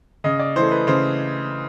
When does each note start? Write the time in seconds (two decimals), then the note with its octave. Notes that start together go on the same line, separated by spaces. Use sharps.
0.24 C#3 D#5
0.39 D5
0.56 E3 A3 C5
0.71 B4
0.87 C#3 C5